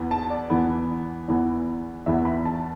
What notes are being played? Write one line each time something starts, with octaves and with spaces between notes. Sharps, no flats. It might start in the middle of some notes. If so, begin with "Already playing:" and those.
Already playing: E2 E3 B3
A5
D5
E2 E3 B3
E2 E3 B3
E2 E3 B3 E5
B5
A5